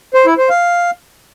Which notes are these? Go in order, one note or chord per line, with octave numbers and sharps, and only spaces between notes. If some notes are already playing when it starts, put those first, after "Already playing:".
C5
E4
C5
F5